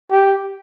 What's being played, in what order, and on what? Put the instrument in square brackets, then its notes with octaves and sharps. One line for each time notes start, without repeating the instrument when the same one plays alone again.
[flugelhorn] G4